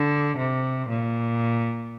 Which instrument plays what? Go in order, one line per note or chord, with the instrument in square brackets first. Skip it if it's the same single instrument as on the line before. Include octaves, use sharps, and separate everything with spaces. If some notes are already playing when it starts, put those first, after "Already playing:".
Already playing: [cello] D3
C3
A#2